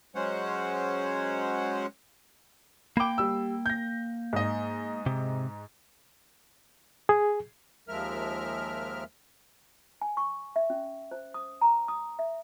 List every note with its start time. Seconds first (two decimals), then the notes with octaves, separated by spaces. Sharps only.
0.15 F#3 G#3 C#4 C5 C#5 F#5
2.97 A#3 G5 B5 D6
3.18 G3 E6
3.66 G6 A#6
4.33 G#2 D#5
5.06 C3
7.09 G#4
7.89 D#2 F3 G#3 A#4 E5 F6
10.01 G#5
10.17 C#6
10.56 E5
10.70 C#4
11.11 C5
11.34 D#6
11.61 A#5
11.88 D#6
12.19 E5